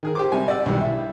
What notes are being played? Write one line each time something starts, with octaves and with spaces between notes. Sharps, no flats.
D#3 G#4 A#4
G4 C5 D6
C3 G3 G#5
D5 F#5 E6
B1 G2 D#3 G3
E4 E5